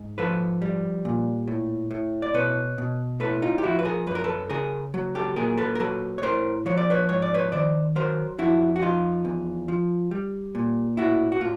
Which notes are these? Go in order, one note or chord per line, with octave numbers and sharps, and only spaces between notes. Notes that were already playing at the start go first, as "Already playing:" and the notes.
Already playing: G#2
F3 A4 B4
G3
A#2
A2
A2
D5
B2 B4 C#5
B2
A2 A4 B4
D#4 F4
G4
F3 E4 F#4
B4
G#4 A#4
F#2 B4
A#4
A4 B4
C#3 G#4 A#4
F#3
G4 A4
A#2 G#4 A#4
A4 B4
A#4
F#3 A4 B4
C#5
A2 A#4 C5
F3 C#5
D5
B4 C#5
G#2 C#5
D5
B4 C#5
D#3 C5 D5
F#3 A#4 C5
F2 E4 F#4
F#4
F3 D#4 F4
E2
F3
G3
A#2
A2 E4 F#4
F#4
A2 F4